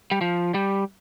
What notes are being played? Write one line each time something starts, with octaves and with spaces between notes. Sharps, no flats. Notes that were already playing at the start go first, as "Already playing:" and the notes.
G3
F3
G3